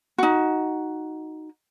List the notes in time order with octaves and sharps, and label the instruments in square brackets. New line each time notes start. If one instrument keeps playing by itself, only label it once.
[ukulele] D#4 F#4